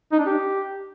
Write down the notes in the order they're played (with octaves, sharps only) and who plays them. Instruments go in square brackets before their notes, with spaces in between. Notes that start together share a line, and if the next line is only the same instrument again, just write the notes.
[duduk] D#4
D4
G4